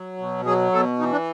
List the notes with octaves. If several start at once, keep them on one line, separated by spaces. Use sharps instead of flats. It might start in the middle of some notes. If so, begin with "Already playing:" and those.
Already playing: F#3
B2
F#3 G#4
B2 A4
E3 D#4
D4